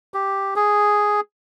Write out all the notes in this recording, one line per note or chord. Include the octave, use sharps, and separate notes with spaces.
G4
G#4